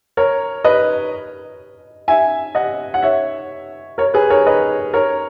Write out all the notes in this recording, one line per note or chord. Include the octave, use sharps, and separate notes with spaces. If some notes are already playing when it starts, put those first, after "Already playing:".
A#4 C#5
B4 D#5
E5 G#5
D#5 F#5
F#5
C#5 E5
A#4 C#5
G#4 B4
A#4 C#5
B4 D#5
A#4 C#5